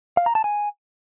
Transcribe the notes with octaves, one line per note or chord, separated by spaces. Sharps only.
F5
A#5
A5
G#5